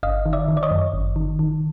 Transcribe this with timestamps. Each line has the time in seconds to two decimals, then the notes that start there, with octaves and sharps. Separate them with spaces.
0.03 G1 D#5 F5
0.26 D#3
0.33 D5 E5
0.48 D#3
0.57 D5
0.63 C#5 D#5
0.71 F#2
0.93 G1
1.16 D#3
1.39 D#3